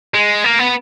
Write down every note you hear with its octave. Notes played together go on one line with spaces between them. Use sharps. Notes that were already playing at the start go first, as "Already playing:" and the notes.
G#3
A#3
B3